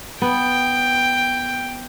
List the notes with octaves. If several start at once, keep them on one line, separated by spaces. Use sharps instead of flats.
B3 G5